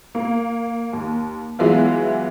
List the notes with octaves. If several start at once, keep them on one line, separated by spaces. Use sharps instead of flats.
A#3
D#2
E3 F#3 G#3 B3 F4